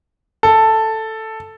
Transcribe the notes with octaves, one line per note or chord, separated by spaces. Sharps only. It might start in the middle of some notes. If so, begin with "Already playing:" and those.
A4